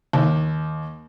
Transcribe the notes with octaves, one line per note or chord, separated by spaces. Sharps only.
D#2